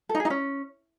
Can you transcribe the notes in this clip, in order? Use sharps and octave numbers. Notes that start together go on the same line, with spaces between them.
A4
D#4
G#4
D#4
C#4